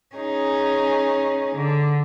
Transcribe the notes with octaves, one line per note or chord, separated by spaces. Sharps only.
C#4 D#4 G#4
D3